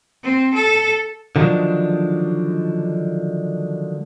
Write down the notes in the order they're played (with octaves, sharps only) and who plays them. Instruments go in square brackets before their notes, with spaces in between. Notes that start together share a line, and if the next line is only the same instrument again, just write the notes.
[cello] C4
A4
[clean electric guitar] D3 D#3 F3 F#3 G#3 D4